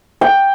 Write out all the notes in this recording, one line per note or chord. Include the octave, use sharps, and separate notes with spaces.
G5